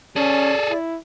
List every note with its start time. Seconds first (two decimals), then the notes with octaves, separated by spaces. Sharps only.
0.16 C#4 G#4 A4 D5
0.70 E4